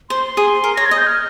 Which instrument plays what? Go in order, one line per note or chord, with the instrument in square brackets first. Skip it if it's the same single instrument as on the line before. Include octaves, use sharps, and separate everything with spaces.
[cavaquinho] C5 [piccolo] C6
[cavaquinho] G#4
A#4
[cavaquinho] C#5 [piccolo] A#6
[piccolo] G#6
[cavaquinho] D#5
[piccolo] G6
F6